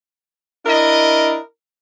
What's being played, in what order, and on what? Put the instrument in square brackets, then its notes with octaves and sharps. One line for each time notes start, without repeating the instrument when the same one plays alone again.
[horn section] D4 E4 A#4 D#5